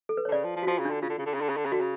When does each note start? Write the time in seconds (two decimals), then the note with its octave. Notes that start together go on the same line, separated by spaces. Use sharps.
0.09 A4
0.17 B4
0.25 D3 C#5
0.32 C#3 D5
0.44 F3
0.56 F3
0.63 F#4
0.67 F3 F4
0.79 C#3
0.85 D4
0.90 D3
1.02 C#3 F4
1.10 D3
1.19 C#3
1.26 D3
1.34 C#3
1.41 D3
1.49 C#3
1.57 D3
1.65 C#3
1.72 D3 F#4
1.81 C#3